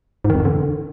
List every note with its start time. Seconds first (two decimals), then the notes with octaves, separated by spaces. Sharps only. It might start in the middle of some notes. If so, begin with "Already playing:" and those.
0.25 G#2
0.30 D#3
0.35 F2
0.40 D#3
0.45 D3